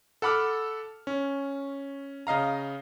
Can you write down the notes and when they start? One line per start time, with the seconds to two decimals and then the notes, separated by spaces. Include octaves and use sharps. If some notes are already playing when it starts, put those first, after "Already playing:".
0.22 A4 F#5 B5 D6 F6
1.07 C#4
2.27 C#3 D#5 F5 A#5